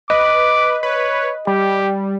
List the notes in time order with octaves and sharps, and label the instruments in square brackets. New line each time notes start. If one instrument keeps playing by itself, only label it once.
[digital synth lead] B4 [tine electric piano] D#5 [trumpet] D6
[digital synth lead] B4 [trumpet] C#5
[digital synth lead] G3 [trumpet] G4